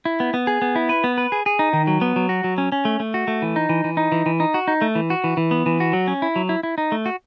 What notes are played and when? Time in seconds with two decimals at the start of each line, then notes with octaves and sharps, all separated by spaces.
0.05 E4
0.20 B3
0.34 B3
0.47 G#4
0.62 B3
0.75 E4
0.89 B4
1.04 B3
1.18 B4
1.32 G#4
1.46 G#4
1.59 D#4
1.73 D#3
1.87 F#3
2.01 B3
2.16 F#3
2.29 F#4
2.44 F#3
2.58 C#4
2.72 C#4
2.85 A3
3.00 A3
3.14 F#4
3.28 A3
3.42 E3
3.56 D#4
3.69 E3
3.84 E3
3.97 D#4
4.12 E3
4.26 E3
4.40 D#4
4.54 F#4
4.68 D#4
4.82 A3
4.95 E3
5.10 F#4
5.24 E3
5.37 E3
5.51 B3
5.66 E3
5.80 F#4
5.93 F#3
6.08 C#4
6.22 E4
6.36 F#3
6.49 E4
6.63 E4
6.78 D#4
6.92 A3
7.06 F#4